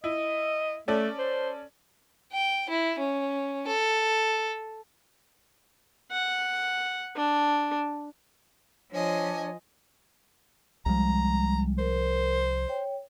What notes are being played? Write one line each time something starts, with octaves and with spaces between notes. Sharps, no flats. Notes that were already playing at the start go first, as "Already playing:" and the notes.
E4 D#5
A3 C#4 A4 D5
C5
G5
E4
C#4
A4
F#5
D4
F3 D4 C#5 D#5 G#5
C2 F3 G3 G#3 A#5
A#4 C5
C#5 G5